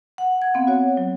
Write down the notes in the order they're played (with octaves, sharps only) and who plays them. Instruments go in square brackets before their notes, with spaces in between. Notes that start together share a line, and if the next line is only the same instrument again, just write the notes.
[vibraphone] F#5
[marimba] G#6
B3 C4 F5
F#4 C#5
F#3